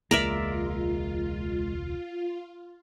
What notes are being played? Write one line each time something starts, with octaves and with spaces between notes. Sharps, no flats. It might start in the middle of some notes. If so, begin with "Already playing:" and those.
E1 C#2 G#3 A#3 F4 A#4 D5 E5